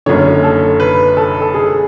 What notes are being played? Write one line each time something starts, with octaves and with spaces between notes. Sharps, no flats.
F#1 F#2 D3 C#5
A4
B4
A4
A4
G#4